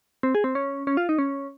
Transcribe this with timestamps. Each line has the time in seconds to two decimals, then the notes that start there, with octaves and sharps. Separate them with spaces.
0.23 C4
0.35 G#4
0.44 C4
0.55 C#4
0.87 C#4
0.97 F4
1.09 D#4
1.18 C#4